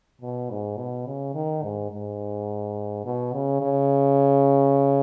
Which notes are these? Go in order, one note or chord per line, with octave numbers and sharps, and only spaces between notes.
B2
G#2
B2
C#3
D#3
G#2
G#2
B2
C#3
C#3